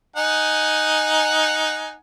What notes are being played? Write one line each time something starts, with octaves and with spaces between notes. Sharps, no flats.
D#4 F#5 G#5